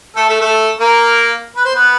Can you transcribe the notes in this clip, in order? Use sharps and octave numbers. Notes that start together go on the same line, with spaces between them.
A3 A4
A3 A4
A3 A4
A#3 A#4
B4
C5
B3 B4